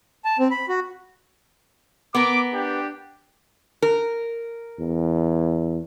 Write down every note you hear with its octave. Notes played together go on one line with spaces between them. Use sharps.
A5
C4
B5
F#4
B3 A#4 D6
D4 G4
A#4
E2